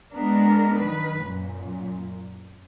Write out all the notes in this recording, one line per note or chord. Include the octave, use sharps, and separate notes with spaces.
G#3 B3 D4 A#4
D#3 F#3 B4
F#2 A#2